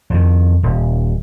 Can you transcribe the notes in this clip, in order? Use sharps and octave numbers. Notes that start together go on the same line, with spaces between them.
F2 D#3
D#1